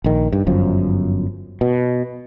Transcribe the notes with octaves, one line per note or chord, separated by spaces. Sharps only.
A#1 D#3
G2
G1 F#2 F3
B2